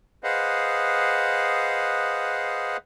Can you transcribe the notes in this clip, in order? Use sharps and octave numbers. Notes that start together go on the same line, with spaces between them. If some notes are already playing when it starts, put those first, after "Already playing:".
G#4 B4 C5 D#5 F5 F#5